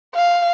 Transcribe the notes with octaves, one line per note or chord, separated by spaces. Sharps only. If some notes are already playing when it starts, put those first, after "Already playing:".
F5